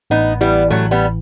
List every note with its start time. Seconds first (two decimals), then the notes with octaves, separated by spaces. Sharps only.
0.10 A1 B3 D#4
0.41 E3 G3 B3
0.70 A1 F#3 A3
0.91 G3 B3